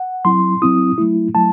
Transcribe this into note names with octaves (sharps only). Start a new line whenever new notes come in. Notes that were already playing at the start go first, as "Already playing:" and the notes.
Already playing: F#5
F#3 C4 E4 C6
F#3 C4 E4 D#6
F#3 A3 E4
F#3 A3 E4 A5